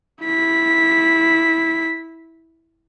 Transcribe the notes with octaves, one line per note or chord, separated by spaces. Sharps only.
E4 B6